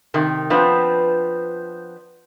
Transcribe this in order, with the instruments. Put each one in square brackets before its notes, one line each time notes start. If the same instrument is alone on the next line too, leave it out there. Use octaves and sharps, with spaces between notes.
[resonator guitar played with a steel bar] C3 D#3
F3 B3 C4 D4 B4